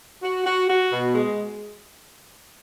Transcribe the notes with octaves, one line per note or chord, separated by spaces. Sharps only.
F#4
F#4
F#4
B2
G#3